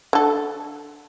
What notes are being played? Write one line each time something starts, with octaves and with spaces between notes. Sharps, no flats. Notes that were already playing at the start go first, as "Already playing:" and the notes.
D3 A4